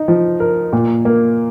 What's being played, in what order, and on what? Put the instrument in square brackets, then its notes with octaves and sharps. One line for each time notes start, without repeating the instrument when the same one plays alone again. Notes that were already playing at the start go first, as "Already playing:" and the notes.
Already playing: [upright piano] D#4
F3
A#4
A#2
A#3